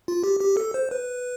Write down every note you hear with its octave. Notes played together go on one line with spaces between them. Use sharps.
F4
G4
G4
A4
C5
B4